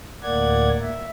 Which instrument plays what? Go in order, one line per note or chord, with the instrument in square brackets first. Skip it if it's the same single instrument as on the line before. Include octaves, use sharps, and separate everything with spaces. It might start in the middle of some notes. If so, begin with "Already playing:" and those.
[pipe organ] D2 A2 A#3 D5 F#5 G#6
E5